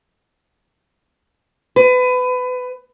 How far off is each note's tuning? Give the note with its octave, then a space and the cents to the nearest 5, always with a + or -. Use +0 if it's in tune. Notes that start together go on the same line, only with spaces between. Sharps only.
B4 +25